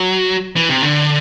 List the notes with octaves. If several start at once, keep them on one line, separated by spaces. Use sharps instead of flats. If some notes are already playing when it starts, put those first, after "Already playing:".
Already playing: F#3
E3
C3
D3